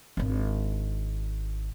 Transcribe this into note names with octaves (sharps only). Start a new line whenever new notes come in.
G#1 D4